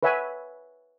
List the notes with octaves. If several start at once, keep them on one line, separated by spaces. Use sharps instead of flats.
B4 C#5 E5 F#5 G#5